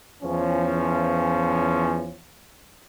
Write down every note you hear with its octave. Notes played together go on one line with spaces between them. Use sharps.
E2 F3 C#4